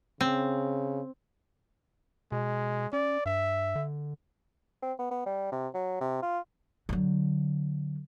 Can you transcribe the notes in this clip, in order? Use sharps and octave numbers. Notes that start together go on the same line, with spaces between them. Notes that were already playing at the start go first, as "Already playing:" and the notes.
C#3 C4
B2 G#3
C#4 D5
G2 E5
D3
C4
B3
B3
G3
C3
F#3
C3
F4
D3 F#3